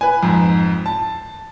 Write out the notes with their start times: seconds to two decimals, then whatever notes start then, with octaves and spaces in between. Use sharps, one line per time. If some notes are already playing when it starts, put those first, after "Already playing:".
0.01 B4 G#5
0.23 F2 G#2
0.86 A5